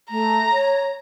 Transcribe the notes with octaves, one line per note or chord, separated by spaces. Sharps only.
A3 A#5
C#5